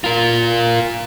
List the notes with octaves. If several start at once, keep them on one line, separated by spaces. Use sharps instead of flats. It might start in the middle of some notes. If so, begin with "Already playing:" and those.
F4 A#4